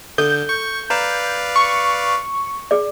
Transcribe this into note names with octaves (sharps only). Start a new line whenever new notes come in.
D3 A4 G6
C#6
B4 D5 F5 A#5
C#6
G#4 D5